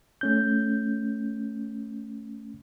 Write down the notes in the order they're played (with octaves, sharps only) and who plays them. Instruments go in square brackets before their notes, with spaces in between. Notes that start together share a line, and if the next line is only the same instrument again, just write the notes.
[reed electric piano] A3 C#4 G6